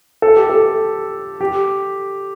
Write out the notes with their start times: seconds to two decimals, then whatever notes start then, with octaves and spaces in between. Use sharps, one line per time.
0.22 A4
0.37 G4
0.50 A4
1.41 G4